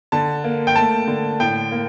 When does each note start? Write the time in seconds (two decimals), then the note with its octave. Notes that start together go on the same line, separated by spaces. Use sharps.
0.12 D3 A5
0.44 A#3
0.67 G5
0.76 A3 A5
1.07 D3
1.40 A2 G5
1.72 A#3